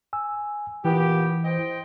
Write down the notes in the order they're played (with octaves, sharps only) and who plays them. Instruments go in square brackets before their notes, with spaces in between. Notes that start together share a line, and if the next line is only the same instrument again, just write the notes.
[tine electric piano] G#5 E6
[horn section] A#2 B3 G4 [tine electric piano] E3 E4
[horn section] C5 D#5 G5